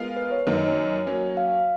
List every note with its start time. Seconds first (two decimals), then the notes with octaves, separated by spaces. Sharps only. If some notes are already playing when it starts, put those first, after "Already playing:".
Already playing: G#3 B3 F4 A#4 F5
0.16 B4
0.31 C#5
0.46 F#2 D#3 A#3 C#5
0.56 D#5
0.67 C#5
1.07 F#3 A#3 C#4
1.37 F5